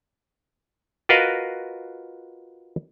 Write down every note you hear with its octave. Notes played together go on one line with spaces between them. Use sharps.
F4 F#4 A#4 B4 D#5 F5